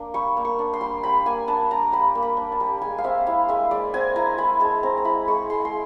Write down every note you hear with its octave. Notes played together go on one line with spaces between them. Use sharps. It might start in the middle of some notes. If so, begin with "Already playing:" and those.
Already playing: A#3 D4
G3 C#6
A#3
C#6
D4
C6
G3
G3 B5
A#3 G#5
D4 A5
G3 A#5
G3 B5
A#3
B5
D4
A5
G3
G#3 G#5
F5
C4 E5
E4 F5
G#3 E5
G#3 D5
C4 G#5
E4 A#5
G#3 B5
G#3 A5
C4 A#5
A#5
E4 B5
G#3 C#6
G#3 C6
C6